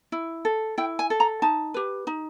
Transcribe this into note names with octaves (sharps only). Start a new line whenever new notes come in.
E4
A4
E4 G5
G#5
A4
A#5
D#4 A5
G4 B4
D#4